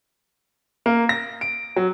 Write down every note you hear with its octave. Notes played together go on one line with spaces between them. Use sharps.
A#3
A#6
D7
F#3